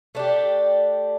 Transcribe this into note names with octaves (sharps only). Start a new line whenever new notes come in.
A3 D4 G4